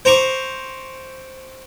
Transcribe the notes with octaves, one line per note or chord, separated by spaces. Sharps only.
C5 A#5 C#6 D6